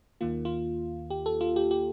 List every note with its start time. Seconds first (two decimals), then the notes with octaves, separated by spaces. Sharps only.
0.21 D#2 D#3 A#3 F4
0.45 F4
1.10 G4
1.26 A4
1.41 F4
1.56 G4
1.71 G4